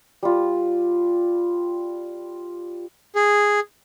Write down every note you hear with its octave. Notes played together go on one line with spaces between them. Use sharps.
G3 F4
G#4